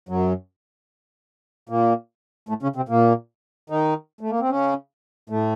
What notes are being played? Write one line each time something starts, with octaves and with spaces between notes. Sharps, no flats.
F#2 F#3
A#2 A#3
A2 A3
C#3 C#4
C3 C4
A#2 A#3
D#3 D#4
A3
A#3
C4
C#3 C#4
A2 A3